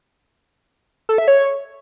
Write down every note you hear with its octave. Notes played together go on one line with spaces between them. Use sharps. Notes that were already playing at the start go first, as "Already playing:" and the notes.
A4
E5
C#5